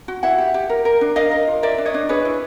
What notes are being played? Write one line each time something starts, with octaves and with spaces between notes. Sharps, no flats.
F#4
E4 E5 F#5
G4
G4
A#4
A#4
D4
A#4 D#5 F5
A#4
F4
A#4 D5 E5
D4
C#5 D#5
D4
G#4 B4 C#5
E4